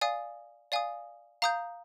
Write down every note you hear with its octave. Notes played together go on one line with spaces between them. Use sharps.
D5 F5 G#5 D#6
D5 F5 G#5 D#6
F5 A#5 D#6 G6